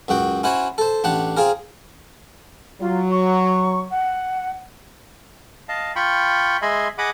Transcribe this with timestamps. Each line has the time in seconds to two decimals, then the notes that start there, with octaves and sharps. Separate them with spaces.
0.08 C#2 F#2 F#4 G5
0.44 C#4 E4 F#4 C5 C#5
0.78 A4 C5
1.04 A1 D4 G4 F#5
1.37 C4 F4 G#4 A#4
2.80 F#3 F4
3.11 C#6
3.91 F#5
5.69 D#5 F5 A5
5.96 F4 G5 B5 C#6
6.62 G#3 D#5 E5 G#5 B5 C6
6.98 G#4 D#5 F#5 B5 D6 D#6